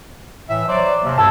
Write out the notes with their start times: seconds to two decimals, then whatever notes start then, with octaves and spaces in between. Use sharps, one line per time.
0.49 A2 E3 E5
0.68 F#3 C5 D5
1.02 D#2 C3
1.18 G2 A5 E6 G#6